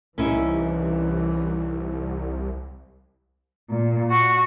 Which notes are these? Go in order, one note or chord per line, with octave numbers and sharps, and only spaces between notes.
C2 E3 C#4 D#4 E4
A#2
F#4